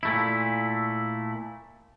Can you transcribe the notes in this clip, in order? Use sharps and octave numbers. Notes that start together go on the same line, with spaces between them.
A#2 A3 E4